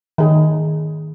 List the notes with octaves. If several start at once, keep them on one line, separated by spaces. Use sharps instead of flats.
D#3 G#4